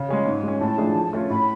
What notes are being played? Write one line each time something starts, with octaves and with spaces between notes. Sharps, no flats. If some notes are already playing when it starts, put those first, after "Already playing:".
Already playing: C#3
G#3 C#4 G#4
G#2 G#5
G#3 C#4
A2 A5
F3 A3 D4 G#4
F3
A3 C#4 F4
A2 B5